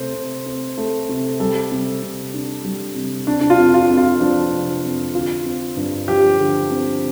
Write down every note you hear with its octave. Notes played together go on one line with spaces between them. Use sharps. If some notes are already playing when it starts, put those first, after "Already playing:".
Already playing: C3 A3 C5
C3
C4
A3
C3
G3 A4
C3
C3
D4
G3
C3
C3 D4
D4
F4
F2
F4
F2
F4
F3 D4
C3
F2
D3 F4
C4
G2
F3 G4
D3
C4